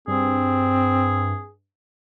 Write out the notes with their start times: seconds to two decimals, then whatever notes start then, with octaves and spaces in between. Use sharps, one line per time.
0.08 G2 C4 G#4